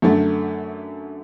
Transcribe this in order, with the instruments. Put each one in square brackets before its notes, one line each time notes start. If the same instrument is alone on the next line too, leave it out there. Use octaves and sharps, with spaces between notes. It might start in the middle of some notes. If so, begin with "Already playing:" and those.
[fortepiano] F#2 D3 A3